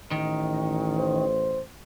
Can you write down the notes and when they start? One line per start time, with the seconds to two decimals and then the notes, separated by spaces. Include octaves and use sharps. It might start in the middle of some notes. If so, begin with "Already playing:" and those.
0.11 A1 D#3
0.98 C5